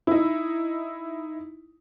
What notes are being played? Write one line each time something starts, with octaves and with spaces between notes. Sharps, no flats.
D#4 E4